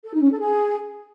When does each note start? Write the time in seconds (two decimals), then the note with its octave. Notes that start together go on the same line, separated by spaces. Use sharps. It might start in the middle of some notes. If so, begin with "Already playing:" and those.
0.04 A4
0.13 D#4
0.22 C#4
0.31 A4
0.40 G#4